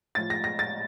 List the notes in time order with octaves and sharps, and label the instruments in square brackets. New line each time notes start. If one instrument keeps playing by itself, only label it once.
[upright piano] A2 F3 A6
A#6
A#6
A6